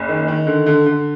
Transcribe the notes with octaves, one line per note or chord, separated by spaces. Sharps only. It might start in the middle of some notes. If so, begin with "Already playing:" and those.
Already playing: F#1
D#3
D#3
D3
D3
D3